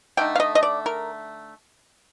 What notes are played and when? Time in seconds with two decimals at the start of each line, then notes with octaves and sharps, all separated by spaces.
0.17 D3 A3 D#4 G5
0.36 F5
0.40 D#5
0.55 D#5
0.63 D5
0.86 A#4